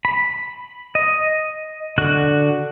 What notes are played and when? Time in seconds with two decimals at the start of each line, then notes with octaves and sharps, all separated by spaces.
0.05 B5
0.95 D#5
1.98 D3 F#4 F#6